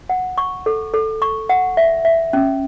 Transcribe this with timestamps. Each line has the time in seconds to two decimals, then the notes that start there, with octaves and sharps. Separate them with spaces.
0.10 F#5
0.38 C#6
0.66 A4
0.94 A4
1.22 C#6
1.49 F#5
1.77 E5
2.05 E5
2.33 C#4